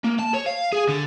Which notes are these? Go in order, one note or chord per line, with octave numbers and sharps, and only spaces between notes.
A#3
A5
C#5
F5
G#4
D3